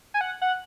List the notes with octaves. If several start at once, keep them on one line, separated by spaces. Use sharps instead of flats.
G#5
F#5
F#5